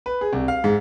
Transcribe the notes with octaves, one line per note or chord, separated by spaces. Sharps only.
B4
G#4
C2
F5
G#2